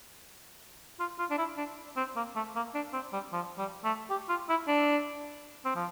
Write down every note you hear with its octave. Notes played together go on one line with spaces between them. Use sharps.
F4
F4
D4
E4
D4
C4
A#3
A3
A#3
D4
C4
G3
F3
G3
A3
G4
F4
E4
D4
C4
F3